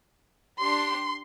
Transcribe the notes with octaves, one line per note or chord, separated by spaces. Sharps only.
D4 G4 C6